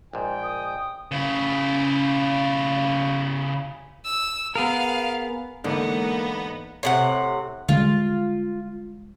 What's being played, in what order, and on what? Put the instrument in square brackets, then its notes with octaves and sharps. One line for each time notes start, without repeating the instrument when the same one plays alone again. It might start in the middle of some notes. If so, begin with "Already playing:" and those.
[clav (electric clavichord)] A#1 G#2 [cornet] G5
[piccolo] D#6
[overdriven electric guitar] C#3 E4
[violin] E6
[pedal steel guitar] B3 G#4 A#4 [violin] F5
[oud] E2 G#2 [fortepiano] D3 [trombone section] A#3 [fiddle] B3 D#4
[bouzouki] A2 C3 F#5
[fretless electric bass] D3 G3 G#3 [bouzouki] F4